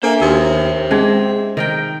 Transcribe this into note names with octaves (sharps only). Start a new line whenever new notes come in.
A#3 D4 A4 C5 E5 G#5
D#2 F#4 A#4
G#3 C4 C#4 D#4 G#4
D#3 A#4 G5